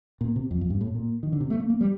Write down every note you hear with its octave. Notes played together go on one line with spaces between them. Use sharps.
A#2
C3
F2
F2
G2
A2
A#2
D#3
D3
C3
A3
A#3
A#3
G3